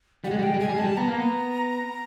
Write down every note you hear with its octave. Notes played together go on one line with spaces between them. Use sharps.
G3 F#5
G#3
G3
G#3 G5
G3
G#3 G#5
G3
G#3 A5
G3
B3 A#5
A#3
B3